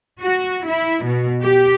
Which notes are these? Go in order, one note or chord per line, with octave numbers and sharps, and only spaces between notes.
F#4
E4
B2
G4